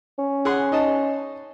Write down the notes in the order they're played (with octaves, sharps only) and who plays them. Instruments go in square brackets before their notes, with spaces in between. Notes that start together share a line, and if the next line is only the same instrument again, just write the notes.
[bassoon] C#4
[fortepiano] G#4 F#5 C6
D#4 D#5 A5